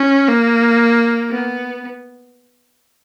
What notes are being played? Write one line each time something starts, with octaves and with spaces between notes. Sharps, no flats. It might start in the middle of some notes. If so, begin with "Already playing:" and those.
Already playing: C#4
A#3
B3